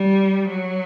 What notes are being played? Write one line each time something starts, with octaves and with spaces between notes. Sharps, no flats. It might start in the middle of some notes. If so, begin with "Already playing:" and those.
Already playing: G3
F#3